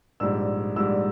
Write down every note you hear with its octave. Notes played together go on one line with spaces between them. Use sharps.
A#1 G#2 G3 E6
A#1 G#2 G3 E6